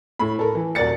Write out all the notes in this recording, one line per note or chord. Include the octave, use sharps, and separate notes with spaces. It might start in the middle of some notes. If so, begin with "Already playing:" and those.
A2 B5
A4 A#4
E3
D#1 F#4 A#4 D5 A6 C#7